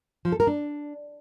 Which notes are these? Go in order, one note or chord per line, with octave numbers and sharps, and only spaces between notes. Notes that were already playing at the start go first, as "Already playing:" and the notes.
F3
A4
A#4
D4